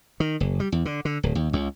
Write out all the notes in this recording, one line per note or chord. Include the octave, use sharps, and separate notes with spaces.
D#3
F#1
G3
E2
D3
D3
D1
D#2
C#2